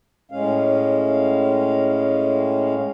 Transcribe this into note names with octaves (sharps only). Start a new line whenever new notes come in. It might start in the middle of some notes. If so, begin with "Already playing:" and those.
A2 G#3 C#4 F5